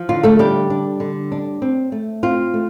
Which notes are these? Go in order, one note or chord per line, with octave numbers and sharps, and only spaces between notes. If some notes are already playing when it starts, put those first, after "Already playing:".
Already playing: F3
D3 F4
A3 A4
G3 D4 G4
D4
D3
D4
C4
A3
C4 F4
A3